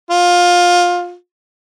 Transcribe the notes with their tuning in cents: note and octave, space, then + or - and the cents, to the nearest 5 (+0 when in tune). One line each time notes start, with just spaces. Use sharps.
F4 +20